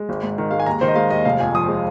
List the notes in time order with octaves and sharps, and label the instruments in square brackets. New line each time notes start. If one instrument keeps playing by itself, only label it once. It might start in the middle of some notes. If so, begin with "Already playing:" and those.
Already playing: [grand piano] G#3
G#1
G#2
D#3
G#3 F5
G#5
D#2 A#5
D#3 C5
D#5
G#3 F5
D#2 D#5
F1 F5
F2 G#5
F3 D#6
G#3